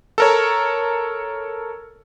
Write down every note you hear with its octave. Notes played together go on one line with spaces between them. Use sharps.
A4 A#4 C#5